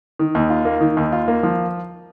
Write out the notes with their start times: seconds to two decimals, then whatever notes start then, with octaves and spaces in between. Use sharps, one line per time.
0.19 D#3
0.35 D#2
0.50 F4
0.65 A#3
0.81 D#3
0.97 D#2
1.12 F4
1.28 A#3
1.43 F3